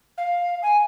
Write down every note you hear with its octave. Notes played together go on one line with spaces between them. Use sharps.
F5
G#5